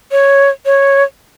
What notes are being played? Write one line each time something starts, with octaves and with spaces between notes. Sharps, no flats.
C#5
C#5